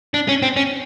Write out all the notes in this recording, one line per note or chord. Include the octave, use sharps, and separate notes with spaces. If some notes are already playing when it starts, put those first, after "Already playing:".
D4
C#4
C4
C#4